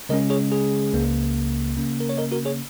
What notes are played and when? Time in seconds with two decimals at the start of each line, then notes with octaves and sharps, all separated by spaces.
0.09 C#3 G#3 C#4 A#4 D#5
0.30 G#4 C#5
0.52 G#4
0.93 C#2 C#3 A#3
1.77 C#3 A#3 C#4
2.00 A#4
2.09 C#5
2.18 A#4 D#5
2.32 F#4 A#4
2.45 G#4 C#5